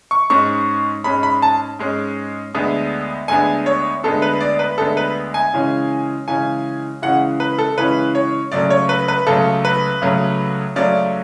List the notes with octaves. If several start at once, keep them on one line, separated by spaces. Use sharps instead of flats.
C#6
G#2 G#3 C#4 C#6
G#2 G#3 C#4 B5
B5
A5
G#2 G#3 C#4
D2 D3 G#3 B3 D4
D2 D3 G#3 B3 D4 G#5
C#5
D2 D3 G#3 B3 D4 A4
B4
D5
B4
D2 D3 G#3 B3 D4 A4
B4
G#5
C#3 E3 G#3 C#4
C#3 E3 G#3 C#4 G#5
C#3 E3 G#3 C#4 F#5
B4
A4
C#3 E3 G#3 C#4 B4
C#5
C#2 C#3 F#3 A3 C#4 D5
C#5
B4
B4
C#2 C#3 F#3 A3 C#4 A4
B4
C#2 C#3 F#3 A3 C#4
C#2 C#3 F#3 A3 C#4 D5